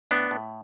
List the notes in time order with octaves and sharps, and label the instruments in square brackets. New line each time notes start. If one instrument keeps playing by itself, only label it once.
[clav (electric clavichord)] A2 B3 D4
A2